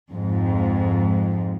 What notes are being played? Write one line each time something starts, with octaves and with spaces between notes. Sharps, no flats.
F2 G#2